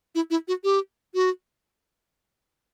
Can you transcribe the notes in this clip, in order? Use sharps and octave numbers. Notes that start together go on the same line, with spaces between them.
E4
E4
F#4
G4
F#4